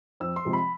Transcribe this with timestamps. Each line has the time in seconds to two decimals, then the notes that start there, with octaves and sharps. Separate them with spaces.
0.20 F2 E6
0.36 C6
0.45 C3 F3 G#3
0.53 B5